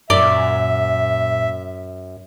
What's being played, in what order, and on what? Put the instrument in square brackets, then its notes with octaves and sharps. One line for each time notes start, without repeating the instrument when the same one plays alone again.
[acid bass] F#2 [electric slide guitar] A#2 A#5 [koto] D5 [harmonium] E5